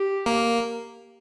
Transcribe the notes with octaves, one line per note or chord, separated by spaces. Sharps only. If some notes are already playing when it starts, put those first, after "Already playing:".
Already playing: G4
A#3